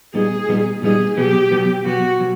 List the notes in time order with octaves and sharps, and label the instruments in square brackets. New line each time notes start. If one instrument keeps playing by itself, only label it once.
[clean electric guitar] A#2 G3 B3 D#4 [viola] G#4
[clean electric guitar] A#2 G3 B3 D#4
[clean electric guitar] A#2 G3 B3 D#4 [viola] G#4
[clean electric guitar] B2 F#3 B3 [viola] G4
[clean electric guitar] B2 F#3 B3
[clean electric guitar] B2 F#3 B3 [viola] F#4
[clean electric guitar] B2 F#3